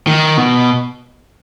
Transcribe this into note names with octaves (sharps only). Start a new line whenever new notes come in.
D#3
B2